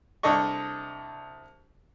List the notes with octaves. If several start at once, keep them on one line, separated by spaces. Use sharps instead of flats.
C2 D4 A4 D#5 C#6